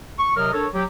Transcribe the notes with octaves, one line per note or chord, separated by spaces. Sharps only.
C#6
C3 F#3 A#4 D#5 F6
D4 A4 A#4 C#5
F#3 G4